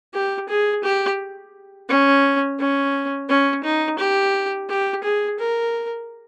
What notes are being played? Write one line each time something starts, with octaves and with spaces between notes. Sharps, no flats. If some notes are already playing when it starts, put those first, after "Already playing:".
G4
G#4
G4
C#4
C#4
C#4
D#4
G4
G4
G#4
A#4